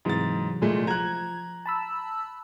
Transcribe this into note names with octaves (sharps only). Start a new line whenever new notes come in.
G#2 C3 E3 F#3 A6
A#2 G#3 A3
F3 A#5 F#6 G#6
A5 B5 E6